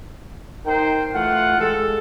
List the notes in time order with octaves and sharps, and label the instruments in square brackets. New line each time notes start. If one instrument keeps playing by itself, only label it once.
[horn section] D#4 A#4 C5 G5
E3 A3 F4 F#5
G#3 G4 A4